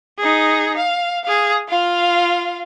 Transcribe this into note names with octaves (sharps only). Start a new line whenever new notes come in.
D#4 G#4
F5
G#4 F5
F4 F5